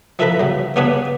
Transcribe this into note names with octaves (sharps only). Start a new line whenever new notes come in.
F3 E4 A4 B4 A#5 B5
C#3 F#3
C#3 B3 C#4 D4 G#4 B4